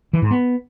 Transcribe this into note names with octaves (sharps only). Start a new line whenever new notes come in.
E3
G#2
B3